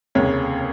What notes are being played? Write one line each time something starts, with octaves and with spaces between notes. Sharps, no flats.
F1 D#2 C#3 C#5